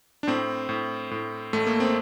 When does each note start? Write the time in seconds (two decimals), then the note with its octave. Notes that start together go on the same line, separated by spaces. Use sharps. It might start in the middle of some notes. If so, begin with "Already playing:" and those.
0.23 D4
0.27 A2 C4
0.69 A2
1.11 A2
1.53 A1 A3
1.67 A#3
1.80 C4